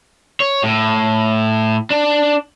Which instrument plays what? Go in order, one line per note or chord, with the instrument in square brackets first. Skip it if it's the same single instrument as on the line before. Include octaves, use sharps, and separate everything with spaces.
[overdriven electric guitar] C#5
A2
D4